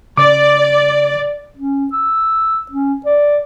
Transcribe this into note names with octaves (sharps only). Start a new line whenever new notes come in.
C#3 D5 D6
C#4
E6
C#4
D5